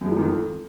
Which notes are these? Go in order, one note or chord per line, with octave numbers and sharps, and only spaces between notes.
F#2
G#3
F3
D#3
F2